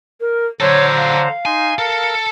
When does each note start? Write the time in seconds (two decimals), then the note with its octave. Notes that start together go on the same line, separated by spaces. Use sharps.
0.20 A#4
0.60 D3 F#3 A4 C5 C#5 A#5
0.97 F5
1.45 D#4 G#5 C6
1.78 A4 A#4